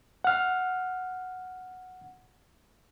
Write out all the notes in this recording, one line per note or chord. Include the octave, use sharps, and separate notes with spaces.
F#5 F6